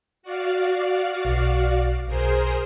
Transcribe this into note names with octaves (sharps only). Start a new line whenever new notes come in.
F#4 D5 F5
B1
B1 G#4 A#4 C5